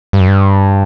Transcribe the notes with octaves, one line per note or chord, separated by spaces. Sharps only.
G2
F#2
G2